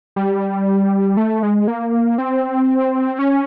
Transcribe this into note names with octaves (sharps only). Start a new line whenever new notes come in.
G3
A3
G#3
A#3
C4
C#4